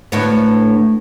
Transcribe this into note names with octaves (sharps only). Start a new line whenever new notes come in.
D2 A2 B3